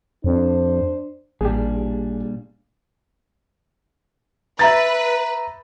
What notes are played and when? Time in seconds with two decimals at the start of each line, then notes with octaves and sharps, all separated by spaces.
0.24 F2 D4 C5
1.41 A1 A#2 G3 D4 G4 G#4
4.59 B4 E5 A#5 A6